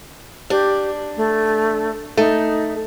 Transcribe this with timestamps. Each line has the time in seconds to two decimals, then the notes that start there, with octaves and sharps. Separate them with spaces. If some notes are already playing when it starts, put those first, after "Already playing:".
0.50 D4 G4
1.17 A3
2.17 A3 D#4